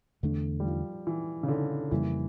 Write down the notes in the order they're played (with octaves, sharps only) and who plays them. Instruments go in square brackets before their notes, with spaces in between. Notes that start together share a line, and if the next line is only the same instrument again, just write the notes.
[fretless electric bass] E2 D3 A3 D4
[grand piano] G3
F3
E3
C#3
D3
[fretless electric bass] F2 C#3 G3 A#3 [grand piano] E3